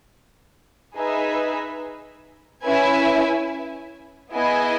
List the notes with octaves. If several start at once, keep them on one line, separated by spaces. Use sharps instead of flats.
D#4 G#4 B4 E5
C#4 E4 B4 E5 G#5
B3 E4 G#4 D#5 G#5